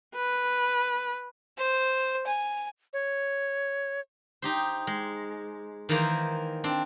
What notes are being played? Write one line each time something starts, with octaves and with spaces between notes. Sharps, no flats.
B4
C5
G#5
C#5
D#4 G4 C5
G#3
D#3 E3 A#3 C5
C4 D4